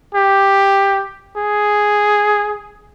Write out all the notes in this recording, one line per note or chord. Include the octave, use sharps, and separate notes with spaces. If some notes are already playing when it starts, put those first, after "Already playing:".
G4
G#4